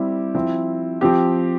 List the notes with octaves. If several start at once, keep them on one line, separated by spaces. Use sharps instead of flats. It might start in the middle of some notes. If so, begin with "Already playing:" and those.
Already playing: G3 C4 E4 G4
F3 C4 E4
F3 C4 G4